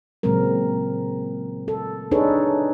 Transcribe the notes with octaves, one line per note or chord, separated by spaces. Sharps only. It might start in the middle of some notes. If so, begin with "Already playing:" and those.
A#2 C#3 F#3 G#3 C4 A#4
A4
D4 D#4 G#4 A4 B4 C#5